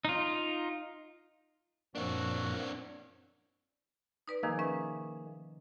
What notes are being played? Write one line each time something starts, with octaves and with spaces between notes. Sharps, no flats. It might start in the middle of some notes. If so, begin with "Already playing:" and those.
D#4 F4
F#2 A#2 F3 A#3 C4 D4 F#4
D#4 B4 D5
C3 D#3 F3 A#3 D#4 G#4
C#4 B4 E5